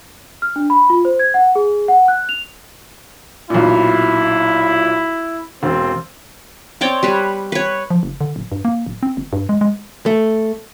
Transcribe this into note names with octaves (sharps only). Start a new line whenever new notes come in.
F6
D4
B5
F4
C5
G#6
F#5
G#4
F#5
F#6
F7
B1 A#2 E4
E1 C4
C4 C#5 D5 G5
G3 B4 C#5
B4 C#5
F3
F#1
D3
D1
G2
A#3
D1
C4
G1
G2
G#3
G#3
A3